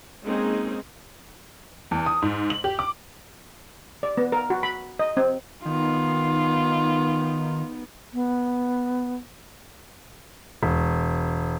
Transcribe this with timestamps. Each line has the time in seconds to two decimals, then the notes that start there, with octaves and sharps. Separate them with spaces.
0.24 G#3 A#3 C4 C#4 D#4 G#4
1.91 E2
2.06 D#6
2.22 G#2
2.50 F#7
2.64 G4
2.79 D6
4.03 D5
4.17 B3
4.32 A#4
4.50 F#4
4.63 B5
4.99 D#5
5.17 C4
5.65 D#3 B3 D#4 F4
8.14 B3
10.63 E1